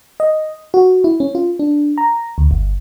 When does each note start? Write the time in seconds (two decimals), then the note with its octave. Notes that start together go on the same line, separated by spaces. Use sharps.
0.20 D#5
0.74 F#4
1.04 E4
1.20 C#4
1.35 F4
1.59 D4
1.98 A#5
2.38 D2
2.51 G1